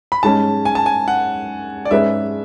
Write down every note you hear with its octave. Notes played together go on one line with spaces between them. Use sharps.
B5
G#2 G#3 C#4 A5
G#5
A5
G#5
F#5
D5
G#2 G#3 C#4 G#4 B4 E5